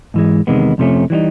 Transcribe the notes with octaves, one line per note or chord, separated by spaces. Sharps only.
G#2 E3 G#3
E2 C3 D#3 G#3 B3
F2 C3 F3 A3 C#4
E3 G3 B3 D#4